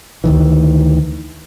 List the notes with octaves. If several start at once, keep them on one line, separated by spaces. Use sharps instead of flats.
D2 D#3 E3